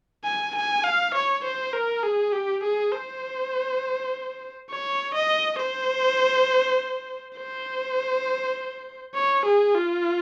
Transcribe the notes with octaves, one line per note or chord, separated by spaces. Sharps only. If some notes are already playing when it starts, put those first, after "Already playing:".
G#5
G#5
F5
C#5
C5
A#4
G#4
G4
G#4
C5
C#5
D#5
C5
C5
C#5
G#4
F4